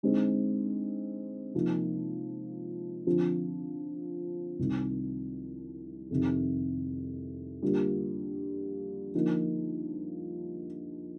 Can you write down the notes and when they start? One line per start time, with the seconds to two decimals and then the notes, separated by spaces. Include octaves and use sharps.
0.03 D3 G#3 C4 D#4
1.54 C3 F3 A#3 D#4
3.07 D3 F3 C4 F4
4.59 C2 C3 D#3
6.10 F2 C3 D#3
7.62 D3 G3 A#3 F4
9.15 D3 F3 A#3 D#4